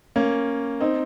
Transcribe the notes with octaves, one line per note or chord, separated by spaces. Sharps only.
A#3 C#4
C4 D#4